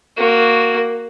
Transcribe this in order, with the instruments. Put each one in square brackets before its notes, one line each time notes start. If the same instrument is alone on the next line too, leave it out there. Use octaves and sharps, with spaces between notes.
[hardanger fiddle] A#3 F#4